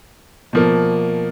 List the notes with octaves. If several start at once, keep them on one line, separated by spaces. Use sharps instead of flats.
B2 F3 A#3